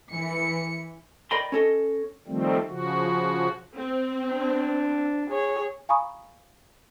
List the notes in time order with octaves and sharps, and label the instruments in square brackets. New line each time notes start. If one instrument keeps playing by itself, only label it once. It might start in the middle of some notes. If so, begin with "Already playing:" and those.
[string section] E3 C#7
[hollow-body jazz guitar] A#4 D5 D#5 G5 B5 C6
C#4 A4 D#5
[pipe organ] D#3 F3 G3 A3 C4
C#3 F3 F#4
[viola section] C4
[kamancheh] D4
G#4 C#5
[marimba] F5 G#5 A#5 B5 C#6 D#6